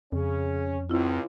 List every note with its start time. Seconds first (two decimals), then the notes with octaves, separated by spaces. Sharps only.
0.12 F2 C#3 C#4
0.90 C#2 C4 E4 F4